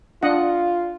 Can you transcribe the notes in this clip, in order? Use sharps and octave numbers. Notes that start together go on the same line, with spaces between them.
D4 F4 D#5 F#5